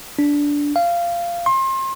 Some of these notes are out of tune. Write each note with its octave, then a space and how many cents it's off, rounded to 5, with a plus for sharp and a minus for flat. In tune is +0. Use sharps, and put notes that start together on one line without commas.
D4 -15
F5 -15
C6 +30